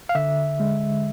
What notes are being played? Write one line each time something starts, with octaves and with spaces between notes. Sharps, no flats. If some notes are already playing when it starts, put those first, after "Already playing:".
F5
D3 E5
G#3